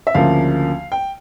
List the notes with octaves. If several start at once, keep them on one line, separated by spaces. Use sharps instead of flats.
E5
D2 C#3 F3 A#3 F5
G5